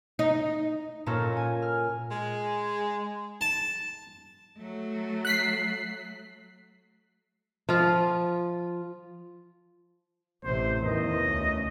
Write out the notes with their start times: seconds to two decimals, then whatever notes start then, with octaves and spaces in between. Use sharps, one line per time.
0.19 D#4
1.06 A#2 A#3 C#4 A4 A#4 A#6
1.37 G#5
1.62 F6
2.11 G#3
3.41 A5
4.57 F#3 A3
5.25 F#6 B6 C7
7.69 F3 F4
10.44 A1 C3 C5
10.84 E2 D#3 D#5
11.21 D2 C#3